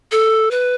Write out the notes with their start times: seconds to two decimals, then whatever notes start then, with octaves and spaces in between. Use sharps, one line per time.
0.12 A4
0.51 B4